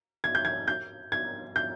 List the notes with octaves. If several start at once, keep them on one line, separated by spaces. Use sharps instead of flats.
G#6
G6
G#6
G6
G#6
G6